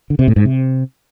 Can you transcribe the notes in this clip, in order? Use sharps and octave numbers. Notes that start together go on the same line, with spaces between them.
D3
C3
A2
G#2
C3